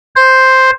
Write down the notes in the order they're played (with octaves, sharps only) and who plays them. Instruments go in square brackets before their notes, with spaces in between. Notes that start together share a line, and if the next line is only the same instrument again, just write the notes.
[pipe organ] C5